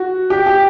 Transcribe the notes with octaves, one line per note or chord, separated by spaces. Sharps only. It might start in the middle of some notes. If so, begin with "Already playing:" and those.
Already playing: F#4
G4
G4